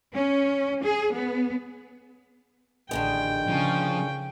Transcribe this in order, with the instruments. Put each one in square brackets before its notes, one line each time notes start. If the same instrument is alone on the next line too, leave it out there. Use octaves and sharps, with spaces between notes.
[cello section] C#4
G#4
B3
[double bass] A1 [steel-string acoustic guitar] D3 D#3 G#3 [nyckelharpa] G5
[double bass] C#3 C#4 [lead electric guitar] F3